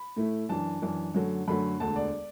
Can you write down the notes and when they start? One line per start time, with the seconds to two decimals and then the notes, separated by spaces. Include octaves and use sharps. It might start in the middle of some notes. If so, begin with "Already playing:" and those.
Already playing: B5
0.16 A2 A3 E4
0.49 F#2 E3 D4 A5
0.82 F#2 E3 D4
1.14 F#2 D3 F#3 A3
1.48 F#2 D3 F#3 A3 B5
1.80 E1 D2 D3 A5
1.96 D5